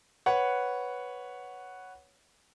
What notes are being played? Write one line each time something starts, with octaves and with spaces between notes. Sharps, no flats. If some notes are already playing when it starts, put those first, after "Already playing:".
B4 C#5 F#5